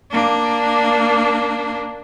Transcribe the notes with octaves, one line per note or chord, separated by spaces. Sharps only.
A#3 D4